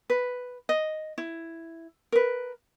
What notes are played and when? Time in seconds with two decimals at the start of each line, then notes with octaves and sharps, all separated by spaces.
0.10 B4
0.69 D#5
1.18 E4
2.12 A#4 B4